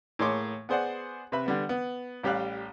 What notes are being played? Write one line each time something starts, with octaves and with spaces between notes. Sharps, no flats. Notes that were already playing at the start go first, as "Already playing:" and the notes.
A2 A#3 G#4 C#5 C6 D6
B3 G#4 C5 D5 F#5
C3 B4 E5 B5
D3 G3 B3
B3
A1 G3 G4 C#5 F5 F#6